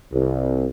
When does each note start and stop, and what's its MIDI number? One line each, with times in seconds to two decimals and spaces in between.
0.12 0.67 36